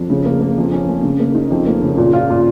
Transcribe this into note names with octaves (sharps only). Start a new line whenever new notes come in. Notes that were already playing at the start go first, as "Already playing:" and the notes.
Already playing: F2
C#3
A#3
A#3
F2
C#4
A#3
C#3
A#3
D#4
F2
A#3
C#3
A#2
F4
A#2